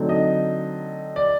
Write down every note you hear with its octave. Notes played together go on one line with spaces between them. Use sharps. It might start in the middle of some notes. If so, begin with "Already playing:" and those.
Already playing: D3 F#3 A3 C4 D#4
D#5
D5